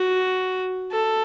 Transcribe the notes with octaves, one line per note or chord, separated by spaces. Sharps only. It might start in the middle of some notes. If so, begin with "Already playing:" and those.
Already playing: F#4
A4